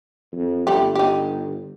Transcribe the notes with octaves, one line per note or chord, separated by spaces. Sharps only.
F2
G1 G3 A3 G4
D#4 G4